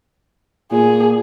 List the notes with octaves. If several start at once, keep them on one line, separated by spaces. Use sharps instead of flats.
A#2 G#4